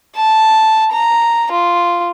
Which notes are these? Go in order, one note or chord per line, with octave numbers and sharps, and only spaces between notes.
A5
A#5
F4